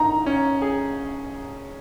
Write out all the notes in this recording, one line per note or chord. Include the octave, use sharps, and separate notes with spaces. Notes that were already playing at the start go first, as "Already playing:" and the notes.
Already playing: D#4 A#5
C#4
G#4